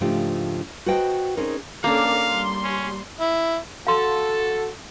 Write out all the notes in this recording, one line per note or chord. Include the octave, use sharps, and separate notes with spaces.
G#2 C#3 F3 A3 D4 G4
F#4 B4 C5 D#5 G5 A5
C4 C#4 D#4 G#4 A#4
A#3 C#4 D4 A4 A#4 F5
G3 C6
C#4
E4
F#4 A4 F5 C6